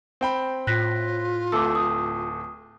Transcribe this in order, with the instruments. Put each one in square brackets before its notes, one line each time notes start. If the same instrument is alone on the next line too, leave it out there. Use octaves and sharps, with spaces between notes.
[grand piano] C4 G5 B5
[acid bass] A2 [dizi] F4 [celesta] F#6 A#6 B6
[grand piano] D1 A3 A4 [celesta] D6 E6
[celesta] D#6